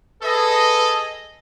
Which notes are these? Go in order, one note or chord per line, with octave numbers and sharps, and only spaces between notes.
G#4 A4 B4 D#5